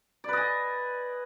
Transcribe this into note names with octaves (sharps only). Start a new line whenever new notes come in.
B4 D5 D#5 G#5